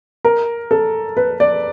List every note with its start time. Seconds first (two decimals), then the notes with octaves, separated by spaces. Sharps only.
0.25 A#4
0.71 A4
1.17 B4
1.40 D5